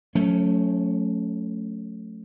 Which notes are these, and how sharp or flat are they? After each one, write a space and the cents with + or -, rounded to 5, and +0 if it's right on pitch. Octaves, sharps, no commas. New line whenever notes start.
F#3 -40 A3 +0 C#4 +10